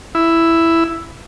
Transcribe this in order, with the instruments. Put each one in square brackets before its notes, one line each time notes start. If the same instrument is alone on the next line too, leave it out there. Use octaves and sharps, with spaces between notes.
[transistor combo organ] E4